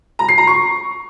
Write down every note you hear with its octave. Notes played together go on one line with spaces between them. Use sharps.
A#5
C7
A#5
C#6